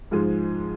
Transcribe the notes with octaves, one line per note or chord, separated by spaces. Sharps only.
G#2 F3 G#3